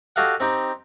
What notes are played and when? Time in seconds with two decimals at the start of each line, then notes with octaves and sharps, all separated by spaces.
0.16 F#4 G4 A4 D#5 F5 F#5
0.40 C4 D#4 G4